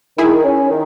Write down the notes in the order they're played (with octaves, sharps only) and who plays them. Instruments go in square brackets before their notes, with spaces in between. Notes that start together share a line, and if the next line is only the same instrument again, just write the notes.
[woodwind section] D#3 [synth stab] E4 G#4
[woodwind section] C#4
D#3